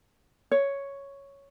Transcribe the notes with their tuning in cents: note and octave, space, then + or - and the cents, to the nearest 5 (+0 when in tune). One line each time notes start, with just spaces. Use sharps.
C#5 +0